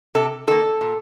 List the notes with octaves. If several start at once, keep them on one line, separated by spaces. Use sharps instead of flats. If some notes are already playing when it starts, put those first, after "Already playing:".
C3 A4
D#3 A#3 A4
A#2